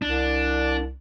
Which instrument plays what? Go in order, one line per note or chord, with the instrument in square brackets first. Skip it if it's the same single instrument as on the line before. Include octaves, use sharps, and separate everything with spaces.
[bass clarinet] C2 [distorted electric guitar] D4